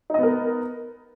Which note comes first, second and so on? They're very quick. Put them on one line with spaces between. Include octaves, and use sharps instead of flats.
D#4 D#5 B3 A#4